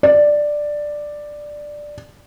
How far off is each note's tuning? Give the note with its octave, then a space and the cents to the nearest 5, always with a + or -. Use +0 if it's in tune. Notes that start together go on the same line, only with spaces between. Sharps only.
D5 +5